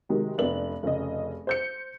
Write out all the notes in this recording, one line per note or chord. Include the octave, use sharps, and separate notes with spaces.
C3 D#3 F#3 G#3
F1 B3 D4 F#7
F1 C#3 D#5
C5 G6 C#7